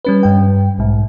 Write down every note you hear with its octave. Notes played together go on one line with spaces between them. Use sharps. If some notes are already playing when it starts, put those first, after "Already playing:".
G3 C#4 B4
G2 G3 G5
B1 G#2